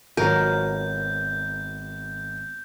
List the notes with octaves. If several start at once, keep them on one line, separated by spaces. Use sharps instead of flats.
G#1 B2 F3 F#3 A#4 G6